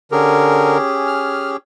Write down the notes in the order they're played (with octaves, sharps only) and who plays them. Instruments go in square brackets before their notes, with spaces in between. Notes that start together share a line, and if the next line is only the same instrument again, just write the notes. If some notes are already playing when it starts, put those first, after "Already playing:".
[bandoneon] D3 A#4 [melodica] C#4 G4 G#4
[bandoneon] F6